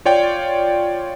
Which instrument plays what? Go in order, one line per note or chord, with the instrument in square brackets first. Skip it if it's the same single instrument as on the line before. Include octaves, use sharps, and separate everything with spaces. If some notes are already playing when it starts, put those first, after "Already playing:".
[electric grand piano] F4 C#5 D5 G5